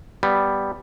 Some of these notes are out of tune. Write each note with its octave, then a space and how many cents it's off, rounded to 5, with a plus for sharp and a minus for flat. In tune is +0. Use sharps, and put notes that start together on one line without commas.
G3 +0 B3 +0